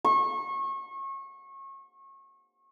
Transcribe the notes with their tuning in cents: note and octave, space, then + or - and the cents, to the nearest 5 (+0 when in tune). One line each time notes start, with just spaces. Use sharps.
C#6 -30